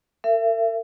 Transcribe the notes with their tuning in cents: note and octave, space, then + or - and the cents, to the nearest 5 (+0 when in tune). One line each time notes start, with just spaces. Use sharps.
A#4 -45 E5 +35